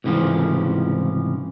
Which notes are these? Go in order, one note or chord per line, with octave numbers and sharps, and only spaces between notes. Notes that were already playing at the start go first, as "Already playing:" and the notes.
C2 G#2 C#3 E3 F3